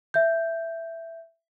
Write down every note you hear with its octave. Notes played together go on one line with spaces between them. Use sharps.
E5 G6